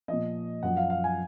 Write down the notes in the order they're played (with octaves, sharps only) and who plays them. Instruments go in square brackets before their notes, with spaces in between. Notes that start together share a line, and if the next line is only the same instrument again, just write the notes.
[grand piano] A#2 F3 D#5
F#2 F3 F#5
F5
F5
G#5